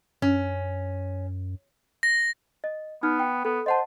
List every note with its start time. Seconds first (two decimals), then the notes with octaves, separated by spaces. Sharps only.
0.22 F#2 C#4
2.03 A#6
2.64 D#5
3.03 B3 D#4 F6
3.20 G5
3.45 B3 A4
3.66 C5 D#5 F#5 A5